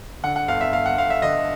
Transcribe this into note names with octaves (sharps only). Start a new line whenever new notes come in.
D3 F#5
F#5
G1 F5
E5
G1 F5
F#5
G1 F5
E5
D3 D#5